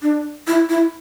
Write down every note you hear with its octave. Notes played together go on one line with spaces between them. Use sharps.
D4
E4
E4